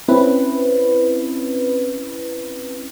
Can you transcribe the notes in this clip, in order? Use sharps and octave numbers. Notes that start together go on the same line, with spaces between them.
C4 C#4 E4 B4